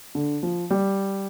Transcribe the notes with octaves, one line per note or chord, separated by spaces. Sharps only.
D3
F3
G3